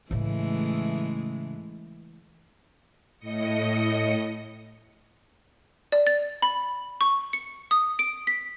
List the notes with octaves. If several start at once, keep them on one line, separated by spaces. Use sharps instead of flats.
A2 C#3 E3 G#3 A3
A2 D#5 C#7
D5
A6
B5
C#6
C#7
D#6
D7
B6